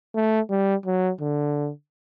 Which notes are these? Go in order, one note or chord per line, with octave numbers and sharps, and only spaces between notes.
A3
G3
F#3
D3